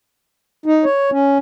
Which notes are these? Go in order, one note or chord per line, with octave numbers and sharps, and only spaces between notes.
D#4
C#5
C#4